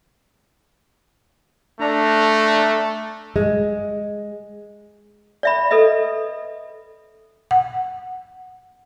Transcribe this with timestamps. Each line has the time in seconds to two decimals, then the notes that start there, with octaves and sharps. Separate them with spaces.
1.80 A3 D4 A#5
3.36 G#3
5.43 D5 E5 B5
5.71 A4 B4 D#5 E5
7.51 F#5